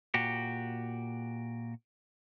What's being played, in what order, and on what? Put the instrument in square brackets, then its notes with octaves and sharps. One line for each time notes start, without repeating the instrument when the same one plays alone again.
[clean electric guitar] A#2 F#4 G4